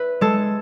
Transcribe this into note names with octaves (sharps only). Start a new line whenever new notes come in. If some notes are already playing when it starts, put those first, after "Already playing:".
Already playing: B4 E5
G#3 A4